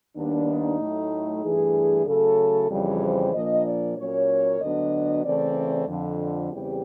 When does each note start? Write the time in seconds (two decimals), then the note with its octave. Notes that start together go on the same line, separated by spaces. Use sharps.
0.16 D#2 D#3 G3 B3 D4
0.48 D#4
0.79 A2 F#3 A3
1.43 G2 E3 A3 D4 G#4
2.07 C#3 F#3 A3 A4
2.70 F2 C#3 E3 G3
3.03 C5
3.34 A#2 F3 A#3 D4 D#5
3.66 D5
3.98 A#2 F#3 A#3 C#4 C#5
4.61 D2 D3 F#3 B3 D4 D#5
5.24 C#3 E3 A3 C4 D5
5.88 F2 D3 F3
6.52 E2 C#3 E3 G3 C4 G4